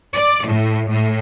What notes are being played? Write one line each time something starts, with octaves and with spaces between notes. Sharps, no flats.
D5
A2
A2